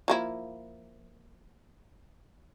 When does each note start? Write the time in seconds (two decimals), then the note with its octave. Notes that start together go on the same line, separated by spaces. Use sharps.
0.08 F3 A#3 E4